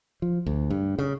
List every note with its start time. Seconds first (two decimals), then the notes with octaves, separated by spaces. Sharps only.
0.22 F3
0.46 D2
0.70 G2
0.99 C#3